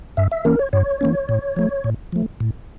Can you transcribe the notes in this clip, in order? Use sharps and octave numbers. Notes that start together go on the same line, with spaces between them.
G2 E5
E5
E3 A#3 C#4 A#4
C#5
G2 C#5
E3 A#3 C#4
A2
F3 A3
A2
F3 A3
A2